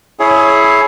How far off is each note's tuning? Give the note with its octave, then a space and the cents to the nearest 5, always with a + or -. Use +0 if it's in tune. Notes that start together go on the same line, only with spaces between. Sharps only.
E4 +0 G#4 +25 C#5 -5